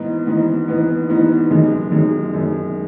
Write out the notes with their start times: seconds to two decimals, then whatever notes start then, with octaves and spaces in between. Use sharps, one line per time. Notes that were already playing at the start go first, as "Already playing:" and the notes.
Already playing: G#2 E3 B3 D#4
0.27 G#2 E3 B3 D#4
0.68 G#2 E3 B3 D#4
1.09 G#2 E3 B3 D#4
1.51 F#2 D#3 G#3
1.92 F#2 D#3 G#3
2.33 F#2 D#3 G#3